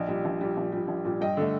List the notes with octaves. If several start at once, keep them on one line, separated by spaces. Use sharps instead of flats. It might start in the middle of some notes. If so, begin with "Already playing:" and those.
Already playing: A#1 D#5
A#2 G3
A#1
A#2 G3
A#1
A#2 G3
A#1
A#2 G3
G2 D#5 G5
D3 A3